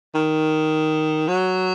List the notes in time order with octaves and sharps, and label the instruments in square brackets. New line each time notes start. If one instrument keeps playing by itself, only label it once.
[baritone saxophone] D#3
F#3